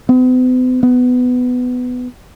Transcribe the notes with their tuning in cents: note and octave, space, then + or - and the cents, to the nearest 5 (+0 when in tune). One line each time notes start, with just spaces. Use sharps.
B3 +45
B3 +15